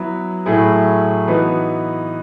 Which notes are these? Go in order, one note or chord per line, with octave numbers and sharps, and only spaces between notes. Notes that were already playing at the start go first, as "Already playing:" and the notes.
Already playing: F#3 B3 E4 B4
A2 F#3 A3 E4 G#4
E3 B3 D#4 F#4